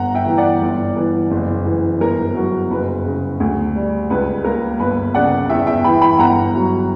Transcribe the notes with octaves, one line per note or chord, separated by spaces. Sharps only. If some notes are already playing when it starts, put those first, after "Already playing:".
Already playing: G1 F#5 A#5
E5 G5
E3
D5 F#5
G1
E3
F#1
E3
G1 A#4
F#3
F#1 B4
C#3
D2
G3
C#2 B4
A#3 A#4
G1 B4
C#3 D5 F#5
E2 E5 G5
E5 G5
E3 G5 B5
G5 B5
G1 F#5 A#5
F#3